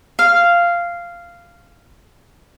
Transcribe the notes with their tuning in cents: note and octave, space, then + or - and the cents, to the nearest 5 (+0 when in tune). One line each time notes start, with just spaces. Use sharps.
F5 -10